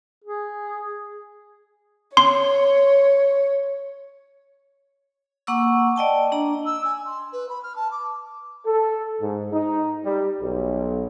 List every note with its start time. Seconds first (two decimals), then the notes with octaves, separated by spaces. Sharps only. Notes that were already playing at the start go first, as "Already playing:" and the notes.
0.24 G#4
2.17 C#5 C6
5.47 A#3 F#5 A#5 C#6 D6 E6
5.96 D5 D#5 G5 A5
6.32 D4 A#5
6.65 E6
6.84 G#5
7.05 C6
7.32 B4
7.49 B5
7.63 F6
7.75 A5
7.90 D6
8.65 A4
9.21 G#2
9.52 D#4
10.05 G3
10.40 B1